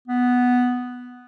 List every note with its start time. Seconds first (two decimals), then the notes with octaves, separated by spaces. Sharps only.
0.08 B3